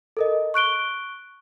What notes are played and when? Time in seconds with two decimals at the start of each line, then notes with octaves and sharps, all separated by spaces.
0.17 A4 A#4 D#5
0.54 C#6 F#6 D7 G7